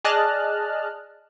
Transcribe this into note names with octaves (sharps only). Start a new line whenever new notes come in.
G#4 D5 D#5 A5 F6 F#6